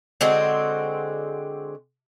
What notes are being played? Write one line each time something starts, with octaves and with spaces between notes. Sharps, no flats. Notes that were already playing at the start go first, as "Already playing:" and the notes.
D3 G#3 C4 F#4